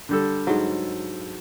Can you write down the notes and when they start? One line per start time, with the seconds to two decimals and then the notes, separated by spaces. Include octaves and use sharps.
0.09 D3 G3 A4
0.47 G#2 F#3